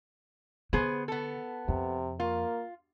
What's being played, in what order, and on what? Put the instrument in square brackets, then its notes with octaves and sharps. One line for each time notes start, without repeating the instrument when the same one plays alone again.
[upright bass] D3 [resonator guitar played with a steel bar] B3 G#4 C5
[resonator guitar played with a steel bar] B3 A4
[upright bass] F2 [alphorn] C3
[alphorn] A#3 [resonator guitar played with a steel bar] F4